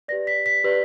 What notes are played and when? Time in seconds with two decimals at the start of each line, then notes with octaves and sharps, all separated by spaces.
0.08 G4 B4 D5 A#6
0.27 B6
0.46 B6
0.64 G4 B4 D5